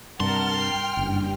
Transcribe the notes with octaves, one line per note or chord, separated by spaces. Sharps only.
G2 C3 A#4 F#5 A5 C6 F6
G5
F#1 G2